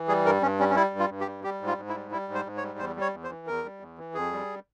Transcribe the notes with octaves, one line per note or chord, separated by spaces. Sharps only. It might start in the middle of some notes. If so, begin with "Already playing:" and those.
Already playing: E3
G3 G#4
G2 A#4
G2 C#4
G3 C#4
C#4
G3 E4
G2
F4
G2
G4
G3
G3 G4
G#2
F4
G#2
E4
G3
G3 E4
G#2
C5
G#2
C#5
G3
E2 C5
G3
C#5
E2
C5
E3
E2 A#4
G3
E2
E3
F2 G#4
G3